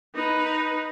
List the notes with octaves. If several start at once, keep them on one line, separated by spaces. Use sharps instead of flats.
D#4 B4